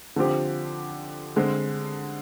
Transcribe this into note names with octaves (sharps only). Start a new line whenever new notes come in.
D3 F3 C4 G4
D3 G#3 C4